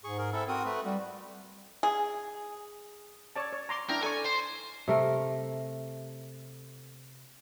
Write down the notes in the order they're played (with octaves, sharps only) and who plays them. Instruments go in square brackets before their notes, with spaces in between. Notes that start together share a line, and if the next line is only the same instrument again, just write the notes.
[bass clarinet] G#2 [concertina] G#4 C#6
[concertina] G#4 A#4
C4 E4 A4
[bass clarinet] C4 [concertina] F#4 A#4 D#6
[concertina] A3 B4
[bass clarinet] G3 [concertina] F#4
[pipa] G#4
[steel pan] C#5 D5 A5
C#5
A#5 C6 D6
[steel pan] D4 E4 G5 [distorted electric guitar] A#4
[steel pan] A4 D5 C#6 [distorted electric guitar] G#5
[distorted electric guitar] C5
[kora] C3 A3 A#4